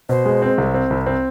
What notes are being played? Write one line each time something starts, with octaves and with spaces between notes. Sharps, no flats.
B2 C5
G#3
C4
C2
C4
C2
C4